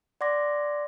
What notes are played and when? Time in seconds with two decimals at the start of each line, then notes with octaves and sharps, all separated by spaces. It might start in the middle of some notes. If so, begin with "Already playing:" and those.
0.21 D5 F#5 C6 D6 A#6